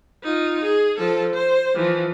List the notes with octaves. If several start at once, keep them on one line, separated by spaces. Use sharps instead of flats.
D#4 F4
G#4
F3 A4
C5
E3 F3